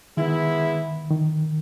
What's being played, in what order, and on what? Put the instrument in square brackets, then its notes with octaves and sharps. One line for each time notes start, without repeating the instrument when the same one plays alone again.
[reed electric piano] D#3 [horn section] G#3 B3 E4
[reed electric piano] D#3